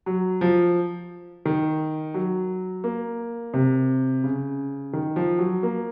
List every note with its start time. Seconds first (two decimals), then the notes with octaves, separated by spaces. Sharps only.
0.06 F#3
0.41 F3
1.45 D#3
2.14 F#3
2.84 A#3
3.54 C3
4.24 C#3
4.93 D#3
5.16 F3
5.39 F#3
5.63 A#3